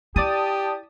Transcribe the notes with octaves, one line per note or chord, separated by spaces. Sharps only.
E4 G4 D5 A5 D#6